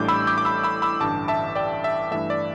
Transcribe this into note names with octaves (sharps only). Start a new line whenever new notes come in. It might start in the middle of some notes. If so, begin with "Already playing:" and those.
Already playing: A1 A2 G3 D4 D6 G6
B5 E6
D6 G6
D6
B5 E6
B5 E6
B5 E6
A1 G2 D3 A5 D6
E5 A5
D5 G5
E5
G2 E3 A3 E5
D5